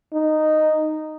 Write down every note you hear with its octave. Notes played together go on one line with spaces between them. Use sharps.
D#4